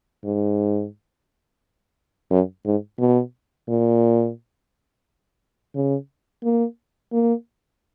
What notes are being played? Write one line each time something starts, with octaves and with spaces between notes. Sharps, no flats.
G#2
F#2
G#2
B2
A#2
C#3
A#3
A#3